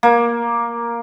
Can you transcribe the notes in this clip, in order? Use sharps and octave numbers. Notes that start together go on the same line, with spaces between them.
A#3